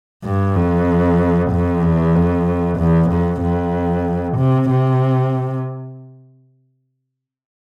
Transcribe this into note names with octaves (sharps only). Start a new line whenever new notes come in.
G2
F2
F2
E2
F2
E2
F2
F2
C3
C3